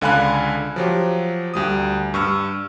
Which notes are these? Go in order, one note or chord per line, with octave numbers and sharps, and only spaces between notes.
C#2 D3 F5 G#5 B5 F#6
F3 F#3 G4
D2 G3 D#6
G2 C#6 E6 F6